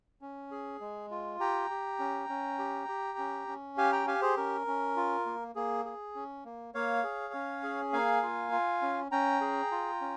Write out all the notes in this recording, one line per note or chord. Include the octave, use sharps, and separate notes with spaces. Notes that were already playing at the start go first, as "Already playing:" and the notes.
C#4
G#4
G#3
F4
G4 G5 A#5
G4
C#4
C#4
G4
G4
C#4
C#4
G4 F5 G#5
G5 A#5
G4 F5 G#5
G#4 C5
C#4 A#4
C#4
F4
A#3
A#3 G#4
G#4
C#4
A#3
A#3 C#5 F5
G#4
C#4
G#4
A#3 F5 G#5
F4
F4
C#4
C#4 G5 A#5
G#4
F4
C#4